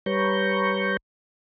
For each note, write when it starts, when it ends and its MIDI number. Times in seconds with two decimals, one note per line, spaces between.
0.06 0.97 55
0.06 0.97 71
0.06 0.97 73
0.06 0.97 82
0.06 0.97 85
0.06 0.97 91